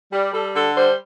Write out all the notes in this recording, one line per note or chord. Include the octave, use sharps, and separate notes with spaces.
G3
G3 A4
D3 A4
G3 C5